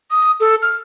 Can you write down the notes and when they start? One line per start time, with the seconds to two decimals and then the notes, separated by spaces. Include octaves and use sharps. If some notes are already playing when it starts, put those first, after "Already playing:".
0.11 D#6
0.40 A4
0.62 F6